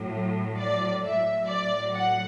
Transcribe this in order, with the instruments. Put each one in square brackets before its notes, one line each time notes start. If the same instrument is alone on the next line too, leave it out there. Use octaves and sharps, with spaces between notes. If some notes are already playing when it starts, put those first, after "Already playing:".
Already playing: [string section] A2 F#3
D5
A2 F#3 E5
D5
F#5